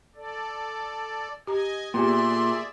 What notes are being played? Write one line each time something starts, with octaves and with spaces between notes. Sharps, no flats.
A4 D5
G4 D#5 G#5 A#5
A#2 B3 G4 G#4 D5 E5 G#5 C6